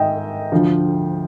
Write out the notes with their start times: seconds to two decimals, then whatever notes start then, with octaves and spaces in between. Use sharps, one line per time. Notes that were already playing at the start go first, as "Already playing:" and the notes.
Already playing: G#2 D#3 D#5 E5 G5
0.52 D2 D3 F3